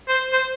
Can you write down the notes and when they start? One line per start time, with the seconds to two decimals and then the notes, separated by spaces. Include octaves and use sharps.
0.08 C5
0.33 C5